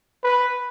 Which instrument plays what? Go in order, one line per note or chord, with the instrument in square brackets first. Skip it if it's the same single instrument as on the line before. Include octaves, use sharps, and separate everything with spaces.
[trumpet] B4